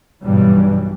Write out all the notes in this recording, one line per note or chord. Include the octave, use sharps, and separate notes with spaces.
B1 G2 B2 E3 G3